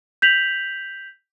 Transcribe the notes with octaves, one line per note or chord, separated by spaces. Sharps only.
G6 B6 F7 F#7